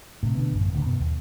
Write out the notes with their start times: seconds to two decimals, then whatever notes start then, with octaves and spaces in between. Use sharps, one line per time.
0.23 A2 C3
0.35 B2 D3 B3
0.52 A1 F#2
0.73 D1 D2 A2 C#3
0.85 F#2 B2 B3
1.01 D#2